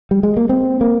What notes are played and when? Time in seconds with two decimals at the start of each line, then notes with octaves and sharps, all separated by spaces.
0.11 G3
0.23 G#3
0.37 A#3
0.49 C4
0.81 A#3